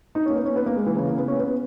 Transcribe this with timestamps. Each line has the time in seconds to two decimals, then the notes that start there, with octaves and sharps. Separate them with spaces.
0.15 D#4
0.26 C#4
0.30 A#3
0.36 B3
0.46 C#4
0.56 B3
0.66 A#3
0.76 G#3
0.86 E3
0.97 C#3
1.07 A#3
1.18 B3
1.28 C#4
1.38 B3